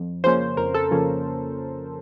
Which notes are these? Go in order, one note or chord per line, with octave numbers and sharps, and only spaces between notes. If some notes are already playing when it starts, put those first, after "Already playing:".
Already playing: F2
C#3 F3 A#3 C#4 C5
F2 A#4
A4
C#3 F3 A#3 C#4